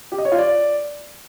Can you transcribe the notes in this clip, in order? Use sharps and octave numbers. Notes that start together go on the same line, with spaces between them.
G4
D#5
C#5
F4
D5